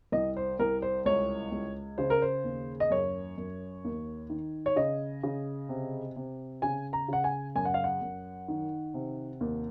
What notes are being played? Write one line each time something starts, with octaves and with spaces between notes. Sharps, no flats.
C2 D#5
C5
C2 A#4
C5
C#2 C#5
C#2
C#3 C5
A#4
C5
D#2
D#5
F#2 C#5
F#2
D#2
D#3
C#5
C#3 D#5
C#3
C3
C3
C#3 G#5
A#5
C#3 F#5
G#5
F#2 G#5
F#5
F5
F#5
F#2
D#3
C3
D#2